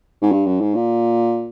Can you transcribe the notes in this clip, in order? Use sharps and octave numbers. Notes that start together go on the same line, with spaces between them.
G#2
G2
F#2
G#2
A#2